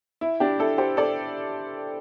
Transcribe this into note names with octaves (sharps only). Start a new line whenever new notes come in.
E4
D4 G4
E4 A4
G4 C5
A4 D5